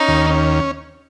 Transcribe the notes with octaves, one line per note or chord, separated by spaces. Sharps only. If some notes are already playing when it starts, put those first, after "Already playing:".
Already playing: C#4 D#4
D#2
C#4